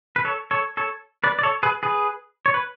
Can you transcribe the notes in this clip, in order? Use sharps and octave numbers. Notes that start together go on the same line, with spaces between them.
B4
A4 C#5
A4 C#5
A4 C#5
B4 D5
D5
A4 C#5
G#4 B4
G#4 B4
C#5
B4